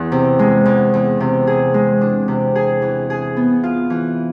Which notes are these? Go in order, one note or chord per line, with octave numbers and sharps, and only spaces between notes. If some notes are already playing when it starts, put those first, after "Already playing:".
Already playing: E2
C3
G#3
E2
E2
C3
G#4
G#3
D4
C3
G#4
E3
G#4
B3
F4
E3